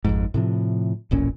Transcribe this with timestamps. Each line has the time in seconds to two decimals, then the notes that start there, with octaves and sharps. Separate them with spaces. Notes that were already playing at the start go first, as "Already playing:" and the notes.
0.04 G#1 F2 G#2
0.34 A2 C3 F3
1.11 D1 A1 A#2 C#4